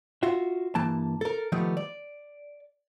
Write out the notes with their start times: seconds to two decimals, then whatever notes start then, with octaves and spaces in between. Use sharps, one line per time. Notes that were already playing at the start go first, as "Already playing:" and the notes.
0.23 F4 F#4 E5
0.75 G2 E3 A#3 A5
1.21 A4 A#4
1.52 D#3 F3 G3 A3 B3
1.77 D5